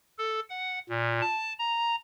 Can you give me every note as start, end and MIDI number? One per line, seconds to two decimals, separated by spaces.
0.18 0.40 69
0.50 0.79 78
0.89 1.21 46
1.21 1.53 81
1.59 1.96 82